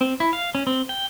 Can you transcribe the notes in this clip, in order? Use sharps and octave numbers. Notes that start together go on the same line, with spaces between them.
C4
E4
F5
C#4
C4
G5